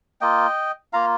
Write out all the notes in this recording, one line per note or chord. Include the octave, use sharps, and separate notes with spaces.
A#3 F4 D#5 G5
A#3 F4 F5 A#5